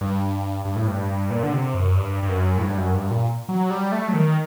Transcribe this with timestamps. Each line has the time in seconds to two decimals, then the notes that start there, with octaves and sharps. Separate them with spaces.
0.01 G2
0.65 G2
0.76 A2
0.88 G2
1.30 A#2
1.43 D3
1.53 C3
1.74 F#2
1.96 G2
2.23 G2
2.29 F#2
2.58 A2
2.62 G2
2.77 F#2
2.94 G2
3.11 A#2
3.49 F#3
3.70 G3
3.92 A3
4.08 F#3
4.14 D#3